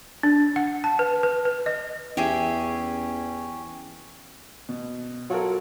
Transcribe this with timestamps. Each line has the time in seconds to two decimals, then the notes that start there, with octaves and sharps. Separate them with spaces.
0.23 D4
0.56 F#5
0.84 A5
0.99 B4
1.23 B4
1.45 B4
1.66 D#5
2.17 E2 C#4 G4 G#4 E5
4.69 B2
5.30 F#3 F4 A4 A#4